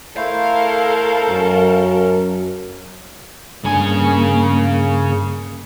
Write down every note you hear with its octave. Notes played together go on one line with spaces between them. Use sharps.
A3 E4 A4 A#4 C5 F5
F#2 C#4
G2 C#3 A#3 G#5